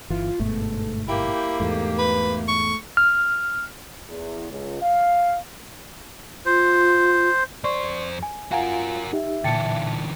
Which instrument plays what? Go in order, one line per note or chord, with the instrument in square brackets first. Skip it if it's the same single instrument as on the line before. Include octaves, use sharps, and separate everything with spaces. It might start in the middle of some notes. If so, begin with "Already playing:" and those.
[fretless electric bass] G1 E3 [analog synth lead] F4
[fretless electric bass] G1 G#2 B2 [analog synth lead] A3
[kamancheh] A#3 G4 [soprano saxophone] E4 [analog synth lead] G5
[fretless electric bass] E2 G#2 [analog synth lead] A3
[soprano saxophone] B4
C#6
[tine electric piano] F6
[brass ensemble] E2
C#2
F5
[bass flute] F4 [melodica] C5
[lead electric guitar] F2 C5 [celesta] D5 C6 C#6
[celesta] G#5
[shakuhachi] F4 [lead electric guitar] F#4 A#4 [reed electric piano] F5 G#5 A#5 [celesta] F#5
[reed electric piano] D#4 G4 [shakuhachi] E5
[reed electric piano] A#2 A5 A6 [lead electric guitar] D3 E3 [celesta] G5 C#7